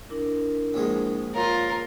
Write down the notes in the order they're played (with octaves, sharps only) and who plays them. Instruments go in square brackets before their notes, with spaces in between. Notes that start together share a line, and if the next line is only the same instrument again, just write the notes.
[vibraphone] D4 E4 A#4
[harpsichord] A#1 F3 G#3
[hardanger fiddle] F4 A#4 [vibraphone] C#5